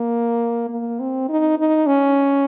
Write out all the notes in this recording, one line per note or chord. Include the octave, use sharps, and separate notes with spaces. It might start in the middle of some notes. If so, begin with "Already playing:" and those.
Already playing: A#3
A#3
C4
D#4
D#4
C#4